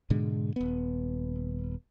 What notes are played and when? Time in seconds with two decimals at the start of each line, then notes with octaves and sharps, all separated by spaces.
0.10 G#2 B2 D3 G#3
0.56 D#1 B3